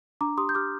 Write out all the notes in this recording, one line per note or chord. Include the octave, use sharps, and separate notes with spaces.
D4 A#5 D6
G4 C6 D#6
G6
G4 D6 F6